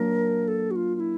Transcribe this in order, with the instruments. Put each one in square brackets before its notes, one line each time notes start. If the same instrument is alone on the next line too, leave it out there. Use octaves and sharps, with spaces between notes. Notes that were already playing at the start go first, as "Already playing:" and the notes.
Already playing: [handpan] F#3 A#3 D4 [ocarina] A#4
[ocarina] A4
F#4
F4
F4
E4